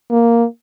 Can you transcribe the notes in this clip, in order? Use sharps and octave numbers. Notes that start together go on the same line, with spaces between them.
A#3